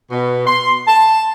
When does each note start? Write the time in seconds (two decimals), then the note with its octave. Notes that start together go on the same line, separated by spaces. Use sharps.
0.11 B2
0.47 C6
0.87 A5